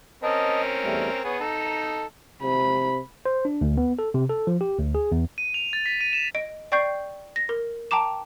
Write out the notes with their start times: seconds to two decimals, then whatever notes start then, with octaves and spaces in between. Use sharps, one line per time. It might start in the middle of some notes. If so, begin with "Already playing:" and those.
0.23 C4 C#4 A#4 D#5 A5
0.84 E2 G3 A3
1.24 B3 G#4 C#5
1.41 D#4 A4 A#5
2.42 C3 B5
3.26 C5
3.45 D4
3.61 D2
3.78 B3
3.99 A4
4.14 C3
4.29 A4
4.47 F3
4.61 G4
4.78 D2
4.95 G#4
5.12 E2
5.38 D#7
5.54 F7
5.73 A6
5.86 B6
6.01 D#7
6.13 E7
6.35 D#5 D7
6.72 D5 G5 C#6 G6 C7
7.36 A#6
7.49 A#4
7.91 G5 A5 A#5 D6 E7